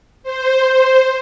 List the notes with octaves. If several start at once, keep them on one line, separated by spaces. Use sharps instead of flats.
C5